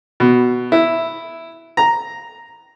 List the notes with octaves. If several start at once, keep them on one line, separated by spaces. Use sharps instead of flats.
B2
E4
A#5